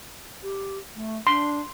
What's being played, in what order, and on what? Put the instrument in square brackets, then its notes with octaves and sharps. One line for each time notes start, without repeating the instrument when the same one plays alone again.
[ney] G4
A3
[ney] D4 [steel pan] C6